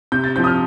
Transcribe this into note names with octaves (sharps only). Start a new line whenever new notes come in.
C3 G6
A6
F3 C4 G6
D#6
F6